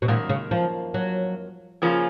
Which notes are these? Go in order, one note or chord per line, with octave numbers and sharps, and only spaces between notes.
B2
F#2 A#2 D#3 A#3
C#3
F3
F#3
C#3 F3 A#3 C#4 F4